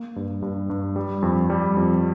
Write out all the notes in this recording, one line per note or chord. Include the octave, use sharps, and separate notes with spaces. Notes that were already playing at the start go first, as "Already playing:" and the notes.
Already playing: A#3
G2
G2
G2
G3
F2
G3
F2